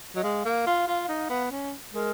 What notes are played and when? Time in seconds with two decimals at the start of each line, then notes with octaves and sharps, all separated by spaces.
0.15 F#3 D#5
0.24 G#3 F5
0.45 A#3
0.66 F4
0.87 F4
1.09 D#4
1.30 B3
1.51 C#4
1.93 G#3 A#4